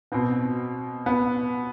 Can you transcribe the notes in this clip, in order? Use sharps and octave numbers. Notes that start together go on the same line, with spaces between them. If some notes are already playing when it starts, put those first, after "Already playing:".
B2 B3 C4
B3